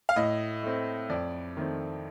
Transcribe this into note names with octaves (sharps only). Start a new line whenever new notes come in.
F5
A2 D#5
A3 C4
F2 D5
D#3 A3 C4